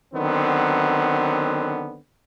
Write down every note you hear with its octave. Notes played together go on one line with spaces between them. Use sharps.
D3 D#3 F#3 B3 C4